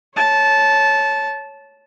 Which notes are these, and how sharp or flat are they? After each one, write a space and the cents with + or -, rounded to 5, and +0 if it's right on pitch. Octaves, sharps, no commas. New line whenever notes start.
C#5 +0 A5 -15